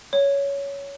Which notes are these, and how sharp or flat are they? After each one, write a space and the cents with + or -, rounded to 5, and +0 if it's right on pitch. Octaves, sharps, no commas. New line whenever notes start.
C#5 +15